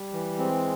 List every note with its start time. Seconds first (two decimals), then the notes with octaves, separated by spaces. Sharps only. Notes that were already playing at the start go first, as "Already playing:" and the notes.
Already playing: G3
0.13 E3
0.39 G#3 C4